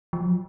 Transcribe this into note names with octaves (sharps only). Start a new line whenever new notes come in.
F3
F#3